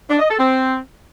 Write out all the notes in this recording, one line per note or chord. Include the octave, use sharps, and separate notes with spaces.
D4
D#5
A4
C4